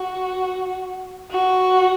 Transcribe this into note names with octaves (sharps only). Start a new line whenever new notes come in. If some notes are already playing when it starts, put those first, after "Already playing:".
Already playing: F#4
F#4